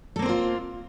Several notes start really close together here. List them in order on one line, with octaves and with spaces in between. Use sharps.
A4 A#3 C4 C5 F4